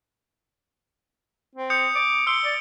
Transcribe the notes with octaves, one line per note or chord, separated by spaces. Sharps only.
C4
D#6 G6 C#7
D6
C6 E6 D7 G7
D5